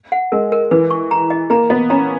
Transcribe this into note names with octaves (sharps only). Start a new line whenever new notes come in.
F#5
G#3 A#4
A#4
E3 B4
C#6
A#5
D#5
A#3 A#5
B3 D#5
C#4 A#5